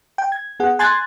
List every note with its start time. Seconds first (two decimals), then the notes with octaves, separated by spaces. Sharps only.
0.18 G5
0.32 G#6
0.60 B3 G#4 F#5
0.79 G#5 C6 F#6 G#6 A6